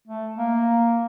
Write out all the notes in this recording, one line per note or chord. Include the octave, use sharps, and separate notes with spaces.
A3
A#3